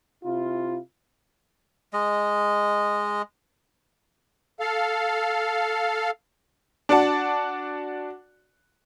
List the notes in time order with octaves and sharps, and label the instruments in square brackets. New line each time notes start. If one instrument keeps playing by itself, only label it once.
[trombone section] C3 E4 F4
[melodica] G#3 D#5
[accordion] A4 F5
[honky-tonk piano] D4 F#4 D5 F#5 A5